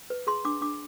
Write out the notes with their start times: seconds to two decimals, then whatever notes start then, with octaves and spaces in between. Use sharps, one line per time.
0.10 B4
0.27 G#4 C6
0.45 D4 D6
0.61 D4 D6